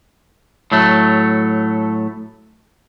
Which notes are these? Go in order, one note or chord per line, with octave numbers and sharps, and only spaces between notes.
A2 F#3 A3